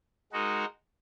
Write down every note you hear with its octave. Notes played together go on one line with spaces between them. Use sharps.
G#3 D#4 F#4 A#4